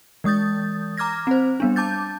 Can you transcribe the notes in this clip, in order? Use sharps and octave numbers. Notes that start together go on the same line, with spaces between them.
E3 G#3 D#6 G6 A6
A#5 D6 F6 G#6 A#6
C4 C5
G3 B3 D4
A5 D6 G6 A6